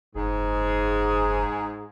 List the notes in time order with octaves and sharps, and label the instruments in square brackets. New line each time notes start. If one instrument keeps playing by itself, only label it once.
[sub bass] F#1 [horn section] G#2 G#4